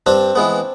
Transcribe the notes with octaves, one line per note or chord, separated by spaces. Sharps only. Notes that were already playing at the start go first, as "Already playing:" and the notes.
G2 C4 D4
E3 G#3 B3